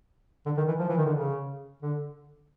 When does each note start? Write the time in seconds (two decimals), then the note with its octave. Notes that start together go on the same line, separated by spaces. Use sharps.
0.46 D3
0.57 D#3
0.68 E3
0.79 F3
0.89 E3
0.97 D#3
1.06 D3
1.14 C#3
1.82 D3